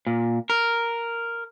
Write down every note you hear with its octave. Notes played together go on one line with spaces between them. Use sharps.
A#2
A#4